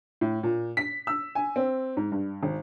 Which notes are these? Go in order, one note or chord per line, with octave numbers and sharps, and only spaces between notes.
A2
A#2
B6
E6
G#5
C4
G#2
G2
G#1